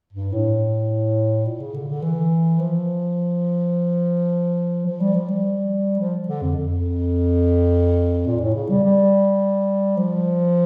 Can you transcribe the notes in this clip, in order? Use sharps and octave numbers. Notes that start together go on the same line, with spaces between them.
G2
A2
A#2
C#3
D3
D3
E3
F3
F3
G3
F3
G3
F3
D3
F2
F2
A#2
A2
C#3
G3
G3
F3